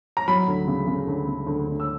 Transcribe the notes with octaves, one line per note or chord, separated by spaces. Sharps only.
A#5
F#3 B5
D2
C#3
C#3
D2
C#3
D2
D2
E6